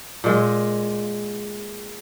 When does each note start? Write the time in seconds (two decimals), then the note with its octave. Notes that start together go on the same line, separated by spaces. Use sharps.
0.24 A#2 G#3